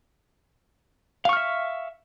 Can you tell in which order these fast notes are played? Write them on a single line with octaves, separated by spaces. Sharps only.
F5 C#6 F6 E5